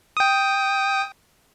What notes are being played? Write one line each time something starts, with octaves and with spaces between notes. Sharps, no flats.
G5 D#6